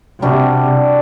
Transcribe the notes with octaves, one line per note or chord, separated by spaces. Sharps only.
C3 G3 D4 F#4